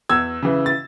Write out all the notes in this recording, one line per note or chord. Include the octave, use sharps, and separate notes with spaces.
E2 E6 G#6
C#3 E3
A6